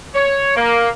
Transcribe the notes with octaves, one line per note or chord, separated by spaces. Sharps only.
C#5
A#3